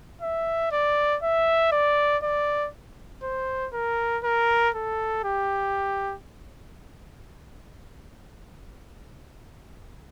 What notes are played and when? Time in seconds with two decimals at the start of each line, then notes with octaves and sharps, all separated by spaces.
0.22 E5
0.72 D5
1.22 E5
1.72 D5
2.23 D5
3.23 C5
3.73 A#4
4.24 A#4
4.74 A4
5.24 G4